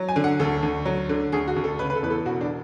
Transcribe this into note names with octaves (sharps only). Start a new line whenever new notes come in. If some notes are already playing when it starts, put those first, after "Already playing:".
Already playing: F#3
G#5
D3
F#5
D2 A4
D2
F#3
D3
D2 G#4
F#4
D2
A4
C#3 B4
B4
A4
E2 B4
A4
E1 F#4
D4